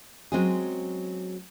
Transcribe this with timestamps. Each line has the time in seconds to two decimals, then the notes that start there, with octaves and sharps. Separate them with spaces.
0.32 F#3 G#3 C4 C#4 G#4